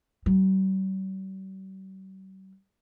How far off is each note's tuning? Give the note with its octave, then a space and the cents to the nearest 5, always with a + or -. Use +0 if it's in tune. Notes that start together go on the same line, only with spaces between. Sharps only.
G3 -45